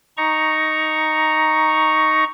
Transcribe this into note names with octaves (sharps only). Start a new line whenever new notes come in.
D#4 A#5 C#6